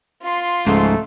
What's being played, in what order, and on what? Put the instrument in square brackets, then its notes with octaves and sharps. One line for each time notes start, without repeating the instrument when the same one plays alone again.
[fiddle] F4 C6
[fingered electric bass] C#2 C#3 F3 [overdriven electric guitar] G#2 [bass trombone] A3